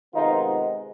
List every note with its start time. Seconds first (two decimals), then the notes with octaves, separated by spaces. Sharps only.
0.14 C3 D#3 G#3 B3 D#4 F4